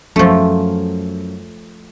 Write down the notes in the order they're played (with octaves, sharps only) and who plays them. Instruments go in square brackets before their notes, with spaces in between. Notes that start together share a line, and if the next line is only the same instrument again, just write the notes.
[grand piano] F#2 [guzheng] F3 A3